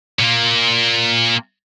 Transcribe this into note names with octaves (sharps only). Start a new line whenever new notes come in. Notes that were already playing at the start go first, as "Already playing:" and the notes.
A#2 A#3